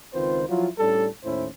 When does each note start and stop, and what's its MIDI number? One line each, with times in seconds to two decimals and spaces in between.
0.13 0.44 37
0.13 0.44 51
0.13 0.44 60
0.13 0.44 65
0.13 0.44 71
0.13 0.44 72
0.49 0.67 53
0.49 0.67 54
0.49 0.67 64
0.49 0.67 65
0.79 1.07 45
0.79 1.07 55
0.79 1.07 61
0.79 1.07 62
0.79 1.07 69
1.24 1.46 39
1.24 1.46 45
1.24 1.46 61
1.24 1.46 64
1.24 1.46 72